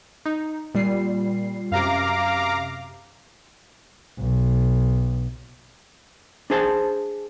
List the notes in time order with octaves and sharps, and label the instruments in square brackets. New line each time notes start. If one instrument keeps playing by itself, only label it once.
[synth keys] D#4
A#2 G3 C7
[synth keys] F#2 C3 [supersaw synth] F5 A#5 D6
[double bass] B1
[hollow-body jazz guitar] D4 G#4 C5 A5